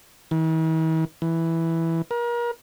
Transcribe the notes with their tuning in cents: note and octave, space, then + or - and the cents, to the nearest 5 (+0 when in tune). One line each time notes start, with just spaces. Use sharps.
E3 -45
E3 +0
A#4 +35